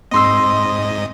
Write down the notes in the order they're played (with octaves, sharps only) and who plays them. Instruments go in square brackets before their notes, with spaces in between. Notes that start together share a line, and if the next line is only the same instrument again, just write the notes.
[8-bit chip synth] G#2 D#5 [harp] C4 C6 E6